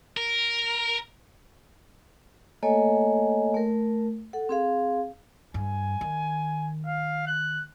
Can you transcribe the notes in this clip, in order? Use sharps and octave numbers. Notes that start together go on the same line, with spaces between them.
A#4
A3 A#3 A4 C#5 D#5 G#5
A3 A#4
A4 F#5
C4 G#4 F5
G2 G#5
D#3
F5
F#6